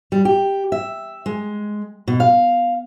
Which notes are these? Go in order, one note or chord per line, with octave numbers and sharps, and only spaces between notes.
G3
G4
E5
G#3
B2
F5